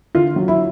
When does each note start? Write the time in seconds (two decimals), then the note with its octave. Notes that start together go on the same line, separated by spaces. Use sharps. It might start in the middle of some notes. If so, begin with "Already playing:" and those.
0.15 D3 F4
0.36 F#3
0.48 E4